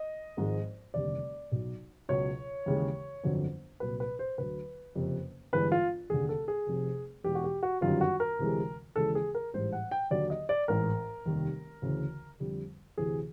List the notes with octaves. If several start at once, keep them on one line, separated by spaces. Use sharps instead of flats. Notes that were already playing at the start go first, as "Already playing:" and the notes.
Already playing: D#5
G#1 G#2 F3 G#3
F1 D#2 D3 G3 D5
B1 B2 F#3
C#2 B2 F#3 C#5
D#2 C#3 E3 G#3
G1 F2 D3 F#3
C2 A#2 F#3 B4
B4
C5
D2 D3 F#3 B4
F#1 F2 C3
G1 G2 E3 G#3 B4
F4
F1 D#2 D3 G#4
A4
G#4
F1 F2 C3
E2 B2 G#3 G4
F#4
G4
F#4
G1 F#2 D#3 G3 F4
F#4
A#4
D2 C3 E3 G#3
D#2 C#3 E3 G#3 A4
G#4
A#4
A1 G#2 E3 G3 C5
F#5
G5
D#2 D3 F#3 D5
D#5
D5
A1 G#2 E3 A#4
F1 D#2 D#3 G3
D2 C#3 E3
F2 D3 G3
D2 C3 E3 G#4